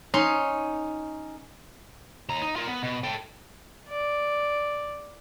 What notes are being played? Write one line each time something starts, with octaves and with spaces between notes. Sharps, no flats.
C#4 D#4 C6
D#2 A#5
D#4
F4 A#4
B3
B2
A4 G5
D5